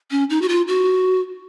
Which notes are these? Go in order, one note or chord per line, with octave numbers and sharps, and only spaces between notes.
C#4
D#4
F#4
F4
F#4